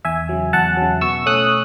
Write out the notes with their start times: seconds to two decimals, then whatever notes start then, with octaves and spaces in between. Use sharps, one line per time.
0.05 E2 E5 G#5
0.29 C#3 F#3
0.53 E2 F#5 A5
0.77 C#3 F#3
1.01 B2 C#6 E6
1.26 A3 C#4 D#6 F#6